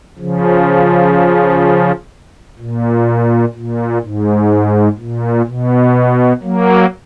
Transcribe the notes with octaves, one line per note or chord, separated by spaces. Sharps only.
C#3 F3
A#2
A#2
G#2
A#2
B2
F#3 A#3